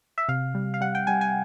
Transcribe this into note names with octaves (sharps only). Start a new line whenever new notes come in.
E5
C3 F5
G3
F5
G3 F#5
G5
G3 G#5
G#5